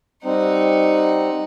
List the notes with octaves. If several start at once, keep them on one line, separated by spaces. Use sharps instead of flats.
G3 C4 D#4 F#5